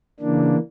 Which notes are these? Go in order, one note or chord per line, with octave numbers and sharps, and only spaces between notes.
C#3 E3 A#3 D4